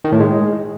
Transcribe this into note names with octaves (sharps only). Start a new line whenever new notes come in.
D#3
A2
G#3